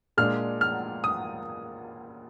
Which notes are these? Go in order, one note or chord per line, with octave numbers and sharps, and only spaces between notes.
A#2 G#3 D4 F6
F6
D#6